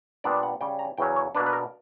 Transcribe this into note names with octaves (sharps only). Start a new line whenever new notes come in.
A#2 G3 B3 D4 D5
F#5
C#3 G3 C#4 G5
A#5
E2 C#3 F#3 C#4 G5
C#5
B2 A#3 D4 B4
B4
A#4